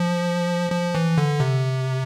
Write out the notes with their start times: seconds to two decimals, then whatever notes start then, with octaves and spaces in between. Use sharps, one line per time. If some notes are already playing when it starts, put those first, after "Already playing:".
Already playing: F3
0.72 F3
0.95 E3
1.18 D3
1.40 C3